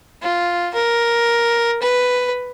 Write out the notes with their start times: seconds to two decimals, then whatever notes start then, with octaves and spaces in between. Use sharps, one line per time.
0.22 F4
0.74 A#4
1.82 B4